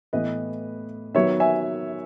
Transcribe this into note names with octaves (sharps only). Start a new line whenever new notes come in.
A2 E3 B3 B4 D#5
D#3 F#3 B3 C#5 E5
E5 G#5